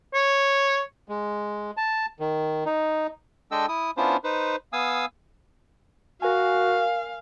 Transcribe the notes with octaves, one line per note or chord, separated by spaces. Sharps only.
C#5
G#3
A5
D#3
D#4
G#3 D4 A4 D#5 G5 E6
E4 D#6
B3 C#4 D4 E4 F4 C5
D#4 B4 C5
B3 F5 G#5 D#6 E6
F#4 A#4 F5 G#5